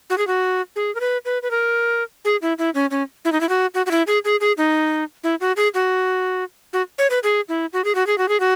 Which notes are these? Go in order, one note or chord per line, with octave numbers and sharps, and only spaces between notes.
F#4
G#4
F#4
G#4
A#4
B4
B4
B4
A#4
G#4
E4
E4
C#4
C#4
E4
D#4
E4
F#4
F#4
F#4
E4
G#4
G#4
G#4
D#4
E4
F#4
G#4
F#4
F#4
C#5
B4
G#4
E4
F#4
G#4
F#4
G#4
F#4
G#4
F#4